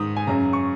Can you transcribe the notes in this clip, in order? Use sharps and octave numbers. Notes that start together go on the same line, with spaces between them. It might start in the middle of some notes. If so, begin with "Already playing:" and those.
Already playing: G#2 D#3 D#6
G#5
F#2 C#3 A#5
C#6